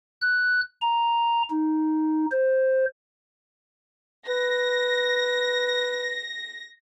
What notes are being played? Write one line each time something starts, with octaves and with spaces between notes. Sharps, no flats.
F#6
A#5
D#4
C5
B4 A#6